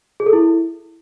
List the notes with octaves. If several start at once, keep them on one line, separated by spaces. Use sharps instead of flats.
G#4
A4
E4